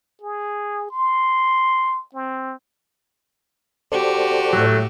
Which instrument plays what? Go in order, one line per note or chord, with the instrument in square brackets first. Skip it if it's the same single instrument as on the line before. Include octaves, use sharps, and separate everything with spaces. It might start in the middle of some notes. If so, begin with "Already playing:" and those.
[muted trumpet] G#4
C6
C4
[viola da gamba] F#4 G4 [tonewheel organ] A4 C5 D5
[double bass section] A2 [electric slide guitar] F#3 A3